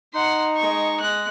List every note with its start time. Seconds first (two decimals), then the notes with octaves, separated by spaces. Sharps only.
0.14 D#4 F#5 C6
0.56 G#3 C#6
1.00 G#3 F#6